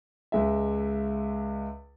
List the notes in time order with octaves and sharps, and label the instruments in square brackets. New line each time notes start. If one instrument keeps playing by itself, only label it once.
[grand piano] C#2 G#3 E5